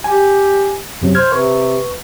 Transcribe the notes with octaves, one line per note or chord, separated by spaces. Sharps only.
G4 G#5
F#2 C3 F#3
C5 F6 G#6
C3 B4 C#6